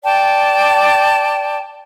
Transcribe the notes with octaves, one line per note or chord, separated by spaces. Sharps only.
D5 G5 A5